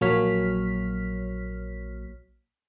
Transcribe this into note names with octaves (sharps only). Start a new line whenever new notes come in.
A#1 F#3 A#3 C#5 F6 B6